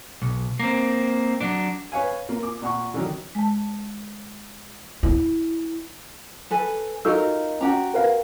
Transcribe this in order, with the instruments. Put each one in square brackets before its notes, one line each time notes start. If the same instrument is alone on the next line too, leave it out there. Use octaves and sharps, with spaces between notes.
[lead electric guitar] B1
A#3 C4
F#3 D4
[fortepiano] B4 C#5 F5 G#5
A#3 F4
D6
A#2 F#5 C#6
D3 D#3 F#3
[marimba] G#3 A5
[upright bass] E4
[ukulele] A4 B4 G#5
[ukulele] D#4 F4 A#4 [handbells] F#4 A4 E6
[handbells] C#4 [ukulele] F#4 G4 A#5
[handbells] A#4 B4 F5